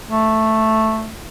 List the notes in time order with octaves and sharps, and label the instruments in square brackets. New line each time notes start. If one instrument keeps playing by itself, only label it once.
[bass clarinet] A3